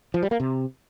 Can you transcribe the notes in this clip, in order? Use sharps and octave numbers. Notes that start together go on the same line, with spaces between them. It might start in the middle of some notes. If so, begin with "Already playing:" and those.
F3
G3
A#3
C3